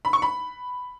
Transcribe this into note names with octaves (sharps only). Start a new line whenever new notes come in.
B5
C#6
B5